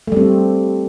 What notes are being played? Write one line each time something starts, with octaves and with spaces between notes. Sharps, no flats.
G3 A3 C4